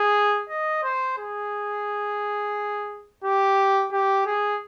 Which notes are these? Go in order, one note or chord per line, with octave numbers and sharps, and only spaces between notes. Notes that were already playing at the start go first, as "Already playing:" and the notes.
Already playing: G#4
D#5
C5
G#4
G4
G4
G#4